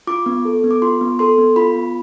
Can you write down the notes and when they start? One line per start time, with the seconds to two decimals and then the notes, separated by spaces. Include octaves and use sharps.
0.07 F4 D6
0.26 B3
0.45 A4
0.64 B3
0.71 D6
0.82 F4 C6
1.01 B3
1.19 A4 C6
1.38 B3
1.56 F4 B5
1.76 B3